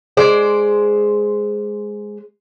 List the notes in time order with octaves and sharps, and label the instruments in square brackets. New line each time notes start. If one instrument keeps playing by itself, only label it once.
[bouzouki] G#3 C5 D5